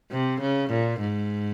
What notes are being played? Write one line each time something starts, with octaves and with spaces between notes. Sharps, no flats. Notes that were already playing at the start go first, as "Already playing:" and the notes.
C3
C#3
A#2
G#2